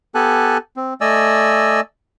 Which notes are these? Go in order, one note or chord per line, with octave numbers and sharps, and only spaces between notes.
B3 G4 A4 G#5 A5 F#6
C4
A3 D5 D#5 G#5 E6